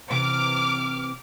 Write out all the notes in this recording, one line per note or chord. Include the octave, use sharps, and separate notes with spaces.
C3 E3 D6 F6